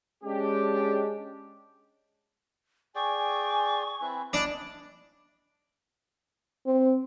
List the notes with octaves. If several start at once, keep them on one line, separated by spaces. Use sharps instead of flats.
G#3 C#4 D4 G4
G#4 D5 G5 G#5 C#6
C4 E4 B4
D4 E4 D5 D#5 A5
C4